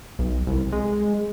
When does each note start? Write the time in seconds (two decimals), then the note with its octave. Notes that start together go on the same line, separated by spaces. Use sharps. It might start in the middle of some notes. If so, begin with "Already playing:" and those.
0.19 B1
0.47 C2
0.72 G#3